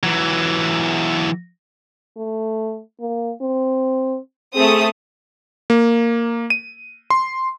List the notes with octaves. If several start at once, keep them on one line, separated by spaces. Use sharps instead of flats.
E3 F#3
A3
A#3
C4
A3 C4 G#4 D#6
A#3
D#7
C6